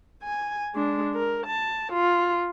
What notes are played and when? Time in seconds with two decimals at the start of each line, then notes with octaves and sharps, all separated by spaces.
0.23 G#5
0.75 G#3 D4
1.15 A#4
1.46 A5
1.92 F4